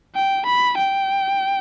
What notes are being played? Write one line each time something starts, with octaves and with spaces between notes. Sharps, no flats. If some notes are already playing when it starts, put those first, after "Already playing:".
G5
B5
G5